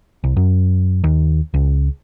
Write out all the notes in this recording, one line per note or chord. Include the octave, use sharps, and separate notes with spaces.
C2
F#2
D#2
C#2